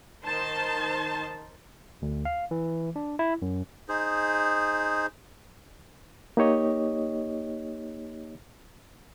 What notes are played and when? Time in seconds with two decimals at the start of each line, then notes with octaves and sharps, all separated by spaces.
0.24 D#3 D#4 C5 A5
2.02 D2
2.25 F5
2.51 E3
2.96 D4
3.19 E4
3.42 F#2
3.89 D#4 G#4 C5
6.37 A#3 D#4 G4 C#5 D#5